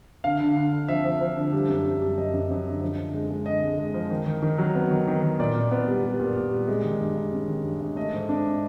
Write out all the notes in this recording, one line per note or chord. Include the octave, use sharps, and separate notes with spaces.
D3 F5
D3
D3
D3
F3 E5
F3
F3
D3
G3
F#2
F#2
G3
F#2 D#5
F#2
F#2
D3
F3
D3
G#3
G#3
D3 D#5
G#3
G#3
F3
D#3
D#3
D#3
F#3
B3
D#3
D#3
D#3
A#2 D5
A#2
B3
G3
G3
A#2
A#2
G3
G#3
D#3
G2
G2
C#4
D#3
G2
G#3
A3 D#5
G#2
D4